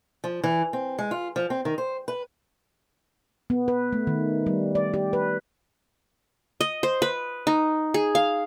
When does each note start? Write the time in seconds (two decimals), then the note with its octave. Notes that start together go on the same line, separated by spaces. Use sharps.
0.24 F3
0.44 E3
0.73 C4
0.99 G#3
1.11 F4
1.36 F3
1.50 C4
1.65 D#3
1.78 C5
2.08 B4
3.50 B3
3.68 B4
3.93 A3
4.07 D#3
4.47 G3
4.75 D5
4.94 G4
5.13 B4
6.61 D#5
6.83 C5
7.02 B4
7.47 D#4
7.94 G#4
8.15 F5